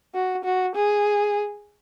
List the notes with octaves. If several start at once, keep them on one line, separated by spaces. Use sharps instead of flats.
F#4
F#4
G#4